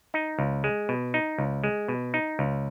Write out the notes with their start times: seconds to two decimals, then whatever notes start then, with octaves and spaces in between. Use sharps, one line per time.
0.14 D#4
0.39 C#2
0.64 G#3
0.89 B2
1.14 D#4
1.38 C#2
1.64 G#3
1.88 B2
2.14 D#4
2.39 C#2